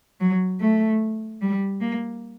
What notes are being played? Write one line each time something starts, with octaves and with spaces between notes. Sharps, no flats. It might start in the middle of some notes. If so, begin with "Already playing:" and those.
F#3
A3
G3
A#3